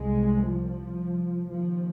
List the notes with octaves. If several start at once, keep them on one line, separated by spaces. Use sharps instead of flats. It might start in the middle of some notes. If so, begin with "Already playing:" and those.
Already playing: C2 C3 G#3
F3
D#2 F3